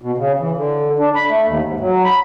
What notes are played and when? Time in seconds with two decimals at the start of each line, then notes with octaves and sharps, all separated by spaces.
0.01 B2
0.18 C#3
0.40 E3
0.57 D3
0.99 D4
1.15 B5
1.30 A3
1.46 D#2
1.64 G#2
1.80 F#3
2.04 B5